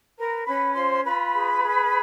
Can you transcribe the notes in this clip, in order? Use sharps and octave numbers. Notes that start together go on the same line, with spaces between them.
A#4 B4 A#5
C#4 B4 B5
F4 C5 C6
F4 B4 B5
G#4
G#4